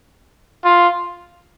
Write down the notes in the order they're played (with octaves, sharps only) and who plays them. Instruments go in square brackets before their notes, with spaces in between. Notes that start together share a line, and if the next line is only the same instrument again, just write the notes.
[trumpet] F4